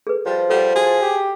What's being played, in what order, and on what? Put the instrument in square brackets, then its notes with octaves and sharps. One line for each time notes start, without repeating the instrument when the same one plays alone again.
[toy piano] G#4 A4 B4
[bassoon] F3 [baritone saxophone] G3 [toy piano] C5
[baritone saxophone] G3 [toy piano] A4 F#5
[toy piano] F#4 [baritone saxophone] G#4
[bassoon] G4